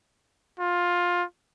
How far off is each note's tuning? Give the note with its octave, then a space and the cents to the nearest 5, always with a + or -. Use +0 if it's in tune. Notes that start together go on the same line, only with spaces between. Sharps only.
F4 +15